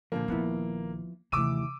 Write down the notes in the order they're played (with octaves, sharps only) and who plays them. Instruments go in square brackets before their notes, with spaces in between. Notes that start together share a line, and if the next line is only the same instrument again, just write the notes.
[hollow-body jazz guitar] A#2 D3 F3 [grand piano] A#3
[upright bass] A#1 D#3 [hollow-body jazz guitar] F3 B3 E4
[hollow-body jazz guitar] D#2 E3 [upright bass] C3 A3 [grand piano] D6 E6 D#7